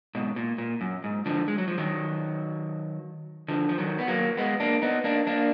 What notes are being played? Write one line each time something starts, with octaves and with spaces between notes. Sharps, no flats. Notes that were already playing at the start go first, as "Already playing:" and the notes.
G#2 B2
A#2
A#2
F#2
G#2
D3 F3
G#3
F#3
F3
D#3 F#3
D3 F3
F3
D#3 F#3
B3
F#3 A#3
G#3 B3
A#3 D4
B3 D#4
A#3 D4
A#3 D4